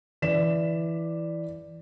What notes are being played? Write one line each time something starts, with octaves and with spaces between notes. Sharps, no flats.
E3 D5 B6 E7